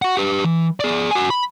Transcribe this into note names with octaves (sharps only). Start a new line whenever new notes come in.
F#4 F#5
G4 B4
E3
G#4 D5
F#4 G#5
B5